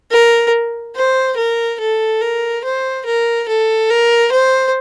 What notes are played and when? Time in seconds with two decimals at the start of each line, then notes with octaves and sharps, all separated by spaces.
0.11 A#4
0.95 C5
1.37 A#4
1.80 A4
2.21 A#4
2.64 C5
3.05 A#4
3.49 A4
3.90 A#4
4.32 C5